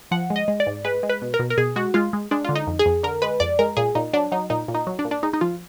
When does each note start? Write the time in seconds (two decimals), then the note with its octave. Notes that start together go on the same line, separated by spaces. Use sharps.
0.11 F3 F#5
0.30 G#3
0.36 D#5
0.48 G#3
0.60 D5
0.67 G#2
0.85 G#3 B4
1.03 G#3
1.10 B4
1.22 B2
1.34 A#4
1.39 B2
1.50 A#4
1.58 B2 G#4
1.76 G#3 F#4
1.94 G#3 F4
2.13 G#3
2.31 G#3 D4
2.45 D3 F4
2.56 D#4
2.67 F2
2.79 G#4
2.86 F2
3.03 D3 A#4
3.22 G#3 B4
3.40 F2 D5
3.59 G#3 A#4
3.77 A#2 G#4
3.95 A#2 D#4
4.13 F#3 D4
4.32 F#3 D#4
4.50 A#2 D#4
4.68 A#2
4.75 D#4
4.87 F#3
4.99 D4
5.05 A#2
5.11 D4
5.23 G#3 D#4
5.33 D#4
5.41 F3 F4